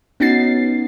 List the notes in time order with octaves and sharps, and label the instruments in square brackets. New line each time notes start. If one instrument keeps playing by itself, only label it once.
[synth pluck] B3 C#4 D#4 F#4 A6 C7